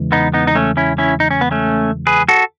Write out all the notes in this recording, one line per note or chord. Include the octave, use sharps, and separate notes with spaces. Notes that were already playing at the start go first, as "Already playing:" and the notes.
Already playing: E2 C#3 E3 G#3
B3 D#4
B3 D#4
D#4
A3 C#4
C#4 E4
C#4 E4
D#4
C#4
B3
A3 C#4
G#4 B4
F#4 A4